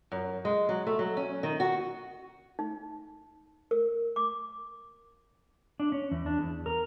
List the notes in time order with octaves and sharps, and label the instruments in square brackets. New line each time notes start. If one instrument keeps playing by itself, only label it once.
[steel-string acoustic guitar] F#2
G#3
F#3
A3
F#3
C#4
D#3
F#4
[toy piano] D#4
A#4
D6
[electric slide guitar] D4
C#4
E2
D4
E2
A#4